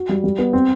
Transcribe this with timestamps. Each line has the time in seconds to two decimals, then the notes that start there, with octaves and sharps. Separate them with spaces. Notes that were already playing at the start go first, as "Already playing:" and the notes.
Already playing: F#4
0.09 G3
0.24 G3
0.39 B3
0.53 C4